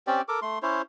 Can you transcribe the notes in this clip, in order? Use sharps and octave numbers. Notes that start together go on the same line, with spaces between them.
C4 C#4 G4 D5
A4 A#4 D6
A3 C6
C#4 E4 C5 C#5